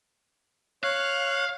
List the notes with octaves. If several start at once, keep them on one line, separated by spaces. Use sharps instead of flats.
C#5 F5 F#6